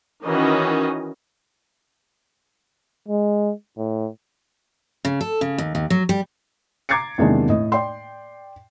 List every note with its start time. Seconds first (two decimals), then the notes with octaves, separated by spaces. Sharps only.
0.23 D#3 E3 C#4 F#4 D#5
3.08 G#3
3.77 A2
5.05 C#3
5.21 A4
5.41 C#3
5.58 D#2
5.75 D#2
5.90 F#3
6.09 G3
6.89 A#5 D6 G#6 A6 C7 C#7
7.18 E2 C3 D#3 G#3 A#3 D4
7.49 A2 D#5
7.72 D5 G5 C6